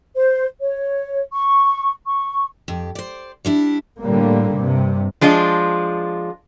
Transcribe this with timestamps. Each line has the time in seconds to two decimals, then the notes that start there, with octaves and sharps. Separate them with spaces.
0.16 C5
0.61 C#5
1.33 C#6
2.07 C#6
2.68 F2 G4
2.95 C5 D5
3.45 G3 D4 E4
4.01 A2 D3 G3 A#3
4.53 G2 C3
5.21 F3 G#3 D4 F4